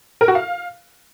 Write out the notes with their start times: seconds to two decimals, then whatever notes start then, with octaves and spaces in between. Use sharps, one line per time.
0.21 A#4
0.28 F#4
0.35 F5